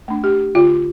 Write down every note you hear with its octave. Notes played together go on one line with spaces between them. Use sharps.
A3 D4
G4
D3 F4